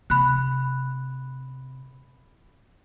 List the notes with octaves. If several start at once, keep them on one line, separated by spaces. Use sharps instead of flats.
C3 B5 F#6